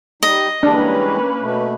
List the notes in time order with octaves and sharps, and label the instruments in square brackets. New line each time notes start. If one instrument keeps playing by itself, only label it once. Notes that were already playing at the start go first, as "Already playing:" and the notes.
[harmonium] G3 D#4 [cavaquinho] D#5
[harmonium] E3 G3 G#3 [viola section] A#3 C#4 B4 [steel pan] D4
[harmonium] B2 A3